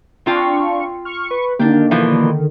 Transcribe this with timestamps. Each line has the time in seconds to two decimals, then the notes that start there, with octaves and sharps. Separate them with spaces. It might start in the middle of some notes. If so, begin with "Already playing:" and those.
0.26 C4 D4 F4 F5 G5 C#6
1.05 C#6 F6
1.31 B4
1.59 D3 D#3 A#3 D4 G4
1.91 B2 E3 F3